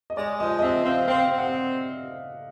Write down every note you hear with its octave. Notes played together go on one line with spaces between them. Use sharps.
D#5
G#3 D5
F3 D#5
D#5
C4 E5
C4 F5
C4 F5
C4
F#5